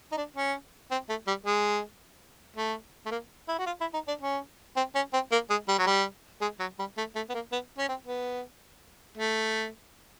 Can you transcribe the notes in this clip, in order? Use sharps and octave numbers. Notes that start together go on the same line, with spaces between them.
D#4
D4
C#4
C4
A3
G3
G#3
A3
A3
A#3
E4
F#4
F4
E4
D#4
D4
C#4
C4
C#4
C4
A#3
G#3
G3
F#3
G3
G#3
F#3
G3
A3
A3
B3
A#3
B3
C#4
C4
B3
A3